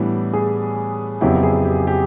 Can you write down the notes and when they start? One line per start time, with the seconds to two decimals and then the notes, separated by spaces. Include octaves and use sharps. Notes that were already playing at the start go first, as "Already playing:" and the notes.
Already playing: A2 E3 G3 B3 D4
0.33 G#4
1.21 F2 C#3 F#3 B3 E4 G4
1.43 G#4
1.65 G4
1.87 G4